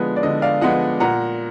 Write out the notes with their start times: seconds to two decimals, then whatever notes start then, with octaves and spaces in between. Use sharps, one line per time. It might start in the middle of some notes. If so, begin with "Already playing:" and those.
Already playing: D3 F3 G#3 B3
0.16 D5
0.23 D3 D#5
0.42 D5 F5
0.61 F3 G#3 B3 D#5 F#5
1.00 A#2 F#5 A#5